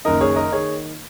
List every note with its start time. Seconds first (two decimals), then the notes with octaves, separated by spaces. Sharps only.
0.05 F#1 F#2 D#3 A#4 D#5
0.21 G#4 C#5
0.36 A#4 D#5
0.52 D#3 G#4 C#5